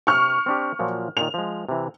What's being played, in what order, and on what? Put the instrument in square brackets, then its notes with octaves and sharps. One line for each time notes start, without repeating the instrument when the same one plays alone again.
[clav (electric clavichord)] C3 [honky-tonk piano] C#6 F6
[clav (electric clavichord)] C4 D4 G4
A#2 F3 F#3
[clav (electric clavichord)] A#2 D#3 [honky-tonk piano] F7
[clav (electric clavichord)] F3 G#3
C3 E3